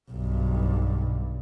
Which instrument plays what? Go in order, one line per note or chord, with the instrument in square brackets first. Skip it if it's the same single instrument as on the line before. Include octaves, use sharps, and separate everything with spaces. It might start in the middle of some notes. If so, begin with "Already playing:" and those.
[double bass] B1 G2